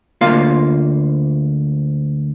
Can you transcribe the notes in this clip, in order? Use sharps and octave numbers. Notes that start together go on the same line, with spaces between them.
D2 A#3 F4 F5